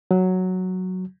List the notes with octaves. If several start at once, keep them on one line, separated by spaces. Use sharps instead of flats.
F#3